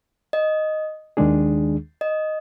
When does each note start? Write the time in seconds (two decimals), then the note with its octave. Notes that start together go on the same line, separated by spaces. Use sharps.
0.33 D#5
1.17 D#2 D#3 G#3 D4 G#4
2.01 D#5